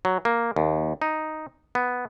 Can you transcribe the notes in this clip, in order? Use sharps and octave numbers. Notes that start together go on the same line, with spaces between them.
F#3
A#3
D#2
D#4
B3